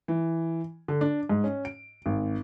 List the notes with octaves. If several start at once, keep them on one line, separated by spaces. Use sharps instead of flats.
E3
D3
D4
G#2
C#4
D7
G#1